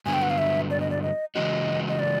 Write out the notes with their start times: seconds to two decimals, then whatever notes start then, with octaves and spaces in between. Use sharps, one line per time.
0.06 G2 D3 F#3 B3 G#5
0.14 G5
0.22 F#5
0.30 F5
0.38 E5
0.70 D5
0.80 D#5
0.91 D5
1.03 D#5
1.35 C#3 E3 G#3 C#4 F#4 D#5
1.88 D#5
1.99 D5